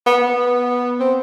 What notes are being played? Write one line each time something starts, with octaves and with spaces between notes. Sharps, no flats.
B3
B3
C4